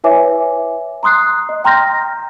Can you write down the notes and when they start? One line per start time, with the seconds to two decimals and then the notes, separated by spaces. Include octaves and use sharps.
0.04 E4 B4 C#5 E5 G#5 D6
1.03 A#5 C6 D#6 F#6 C7
1.49 D#5
1.64 G5 A#5 C6 F6 G6 A#6